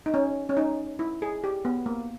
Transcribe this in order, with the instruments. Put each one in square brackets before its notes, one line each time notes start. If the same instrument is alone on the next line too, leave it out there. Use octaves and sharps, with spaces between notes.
[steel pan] D#4
C#4
C#4
D#4
E4
G#4
G4
B3
A#3